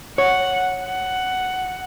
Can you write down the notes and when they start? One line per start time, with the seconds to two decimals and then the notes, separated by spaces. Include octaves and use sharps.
0.18 C#5 F#5
0.83 F#5